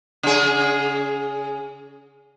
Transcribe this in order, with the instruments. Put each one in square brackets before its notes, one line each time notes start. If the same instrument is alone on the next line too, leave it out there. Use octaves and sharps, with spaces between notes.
[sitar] C#3 G#4